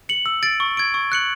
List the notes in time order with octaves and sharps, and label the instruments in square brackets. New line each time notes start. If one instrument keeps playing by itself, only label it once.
[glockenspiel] C#7 F#7
E6
A6 D7
C#6
G#6 D7
C#6
F#6 C#7 F#7